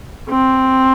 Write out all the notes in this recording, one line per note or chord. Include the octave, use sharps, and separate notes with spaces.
C4